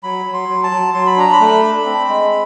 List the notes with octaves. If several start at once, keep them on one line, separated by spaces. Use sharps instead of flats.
F#3 B5
F#3
C6
F#3
A5
F#3
F#3 C6
B5
D4 A#5
B5
A3
D4
C4
G#3